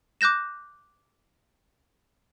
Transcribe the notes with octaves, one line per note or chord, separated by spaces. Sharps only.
D6 F#6 G6 A#6 E7